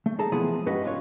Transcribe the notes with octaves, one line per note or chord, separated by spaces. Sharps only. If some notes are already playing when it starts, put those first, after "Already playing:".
A3
G#4 A4 A5 A#5
E3 F3 G#3 B3 E4 G#4
G2 C#4 F#4 B4 D#5
D4 F4 C#5